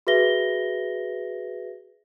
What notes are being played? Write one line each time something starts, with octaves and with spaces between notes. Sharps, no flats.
F#4 G#4 B4 E5 A#6 G7